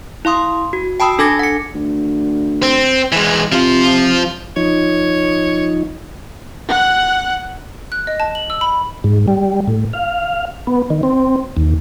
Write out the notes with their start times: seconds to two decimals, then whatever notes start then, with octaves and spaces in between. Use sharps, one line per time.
0.25 E4 F5 C6 D#6
0.73 F#4
1.00 G5 A5 B5 D#6 E6
1.18 D4 A4 G#5 D6 G#6 A#6
1.39 F#5 C#7
1.75 D2
2.63 C4
3.12 E3 G#3
3.52 C3 F3 F4
4.56 F3 D#4 C#5
6.69 F#5 F#6
7.92 F#6
8.07 D#5
8.20 A5
8.35 F#7
8.50 E6
8.61 B5
9.04 G#2
9.28 G3
9.68 A2
9.93 F5
10.67 B3
10.90 D#3
11.03 C4
11.57 D#2